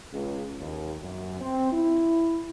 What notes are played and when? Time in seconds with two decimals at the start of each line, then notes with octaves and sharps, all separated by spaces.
0.13 C#2
0.60 D#2
1.03 F#2
1.41 C4
1.72 E4